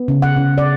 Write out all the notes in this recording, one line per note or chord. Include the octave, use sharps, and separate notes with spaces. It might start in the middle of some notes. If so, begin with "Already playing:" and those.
Already playing: B3
C#3
F#5
C#3
D5